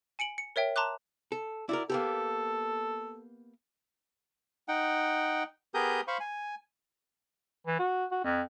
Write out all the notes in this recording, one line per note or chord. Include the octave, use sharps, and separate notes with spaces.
G#5 C#7 D7 F#7
C#7
A#4 C#5 E5 G5
A5 A#5 C6 D6 F#6
A4
E4 F#4 A#4 D5
A#3 B3 G4 A4
D#4 F#5 G5
B3 G4 G#4 A#4 D#6 G6
C5 F5 B5 C#6
G#5
E3
F#4
F#4
F2